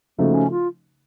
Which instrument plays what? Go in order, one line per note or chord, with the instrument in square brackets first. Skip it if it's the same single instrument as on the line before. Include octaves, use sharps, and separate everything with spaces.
[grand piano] C#3 F3 A3 D#4 F#4 [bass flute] A#3
[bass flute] C#4
F4